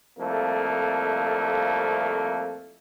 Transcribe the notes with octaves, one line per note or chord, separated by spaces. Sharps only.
C2 F2 A3 A#3